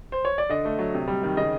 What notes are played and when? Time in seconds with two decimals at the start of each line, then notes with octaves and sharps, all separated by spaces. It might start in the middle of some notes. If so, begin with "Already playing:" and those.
0.12 C5
0.25 C#5
0.38 D5
0.49 D3 D#5
0.65 A3
0.79 F#3
0.94 C3
1.08 G3
1.23 D#3
1.37 C#3 D#5